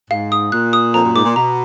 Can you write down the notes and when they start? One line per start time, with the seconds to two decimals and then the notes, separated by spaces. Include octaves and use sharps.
0.11 G#2 F5
0.32 D#6
0.52 A#2 F#6
0.73 D#6
0.93 F2 A#5
1.04 F#2
1.15 G#2 D6
1.25 A#2
1.36 B2 A#5